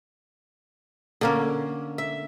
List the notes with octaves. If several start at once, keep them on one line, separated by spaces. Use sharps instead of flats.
D3 A#3 C#4
E5